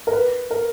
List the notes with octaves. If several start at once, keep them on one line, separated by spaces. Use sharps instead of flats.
A#4
B4
A#4